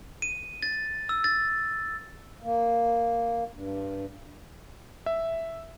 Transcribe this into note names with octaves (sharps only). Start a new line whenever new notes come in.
D#7
A6
E6
A6
A#3
G2
E5